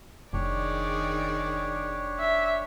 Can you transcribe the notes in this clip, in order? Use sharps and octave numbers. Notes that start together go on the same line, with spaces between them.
F1 D#3 D4 G4 G#4 C#5 D5
E5